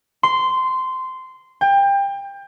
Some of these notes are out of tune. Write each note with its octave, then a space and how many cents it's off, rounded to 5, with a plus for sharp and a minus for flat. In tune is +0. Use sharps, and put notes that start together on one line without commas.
C6 -15
G5 +25